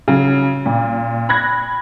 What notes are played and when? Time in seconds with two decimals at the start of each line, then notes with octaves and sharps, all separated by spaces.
0.08 C#3 F#3
0.66 A#2
1.29 B5 F#6 G#6 A#6